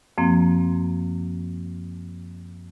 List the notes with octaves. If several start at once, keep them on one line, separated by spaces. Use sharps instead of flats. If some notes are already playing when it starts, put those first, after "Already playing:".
F#2 F3 A#3 C4